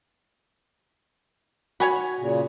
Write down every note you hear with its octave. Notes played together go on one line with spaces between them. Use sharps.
F#4 C#5 G#5 B5
A#2 C#3